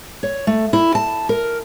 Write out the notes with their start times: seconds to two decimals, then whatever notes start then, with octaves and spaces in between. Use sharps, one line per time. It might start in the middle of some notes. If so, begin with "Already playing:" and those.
0.23 C#5
0.47 A3
0.73 E4
0.95 A5
1.29 A#4